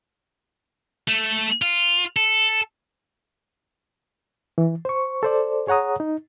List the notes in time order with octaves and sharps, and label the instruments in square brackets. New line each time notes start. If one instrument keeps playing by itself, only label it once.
[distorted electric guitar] A3
F4
A4
[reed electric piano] E3
C5 C#6
A4 C5 D5
G#4 C#5 F#5 A#5 D#6
D#4